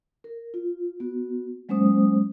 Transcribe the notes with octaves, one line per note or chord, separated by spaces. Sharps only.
A#4
F4
B3 F#4
F#3 G#3 A#3 C#4 C5 D#6